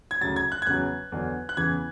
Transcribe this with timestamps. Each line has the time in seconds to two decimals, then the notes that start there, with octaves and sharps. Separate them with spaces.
0.11 G#6
0.21 D2 C#3 F#3 A6
0.36 G#6
0.52 F#6
0.62 G#6
0.67 E2 C#3 F#3 F#6
1.12 E2 D3 F#3
1.49 F#6
1.57 E2 C#3 E3 G#6